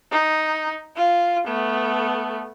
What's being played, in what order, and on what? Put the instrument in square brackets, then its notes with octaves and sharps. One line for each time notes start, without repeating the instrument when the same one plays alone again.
[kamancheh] D#4
F4
A3 B3